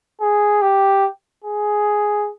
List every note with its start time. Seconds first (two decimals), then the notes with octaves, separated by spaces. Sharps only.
0.21 G#4
0.62 G4
1.44 G#4